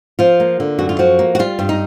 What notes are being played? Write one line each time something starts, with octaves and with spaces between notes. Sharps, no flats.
F3 F4
A#3
D3
F#2 F#4
F4
F3 F#4
A#3
F#4
G3 F4
G2
D#4